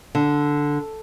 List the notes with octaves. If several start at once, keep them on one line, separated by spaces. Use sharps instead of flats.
D3